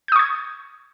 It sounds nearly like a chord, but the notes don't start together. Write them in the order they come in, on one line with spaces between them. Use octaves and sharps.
G6 D#6 C#6 G#6